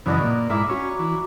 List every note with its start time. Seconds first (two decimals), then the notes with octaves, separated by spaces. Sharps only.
0.06 F#2 C#3 E3 B3 D4 D#5
0.21 A#2
0.50 G#2 E4 A#4 E5 D6
0.69 C#4 F#4 C#6
0.99 E3